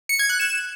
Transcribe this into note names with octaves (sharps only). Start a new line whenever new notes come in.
C#7
G#6
F#6
E7